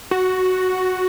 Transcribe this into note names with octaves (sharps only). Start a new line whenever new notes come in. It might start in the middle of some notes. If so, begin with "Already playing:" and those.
F#4